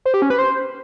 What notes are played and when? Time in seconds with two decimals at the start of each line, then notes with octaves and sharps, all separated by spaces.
0.05 C5
0.14 G4
0.22 C#4
0.30 B4
0.39 C5